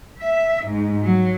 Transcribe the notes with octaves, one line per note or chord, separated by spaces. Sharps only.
E5
G#2
F#3